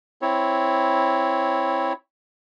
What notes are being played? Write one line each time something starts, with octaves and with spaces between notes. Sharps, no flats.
C4 E4 C#5